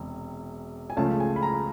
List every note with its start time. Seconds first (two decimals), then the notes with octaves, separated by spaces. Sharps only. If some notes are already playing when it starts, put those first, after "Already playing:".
Already playing: E1 C3
0.90 G#5
0.97 C#2 C#3 F3 A3 A5
1.20 G#5
1.36 B5
1.43 A#5